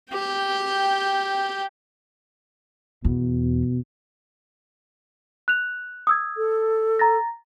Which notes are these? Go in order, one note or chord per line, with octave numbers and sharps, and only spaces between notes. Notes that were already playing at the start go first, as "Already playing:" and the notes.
G4 G5
E2 B2
F#6 F7
D#6 E6 G#6
A4
A#5 A6 A#6